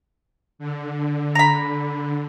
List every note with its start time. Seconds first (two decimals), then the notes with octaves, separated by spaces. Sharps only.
0.59 D3
1.35 A#5 B5